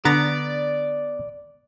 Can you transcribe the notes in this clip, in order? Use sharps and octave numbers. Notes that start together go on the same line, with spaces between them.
D3 B3 D5 A#5 A6